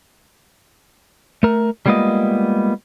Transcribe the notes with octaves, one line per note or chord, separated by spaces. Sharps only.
A3 A#4
G3 G#3 A#3 B3 F4 D#5